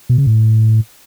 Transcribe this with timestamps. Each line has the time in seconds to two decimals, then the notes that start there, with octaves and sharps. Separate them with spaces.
0.09 B2
0.18 C#3
0.27 A2